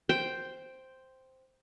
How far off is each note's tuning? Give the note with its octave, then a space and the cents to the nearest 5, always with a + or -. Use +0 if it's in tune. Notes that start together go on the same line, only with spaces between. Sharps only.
C5 +0 G5 +0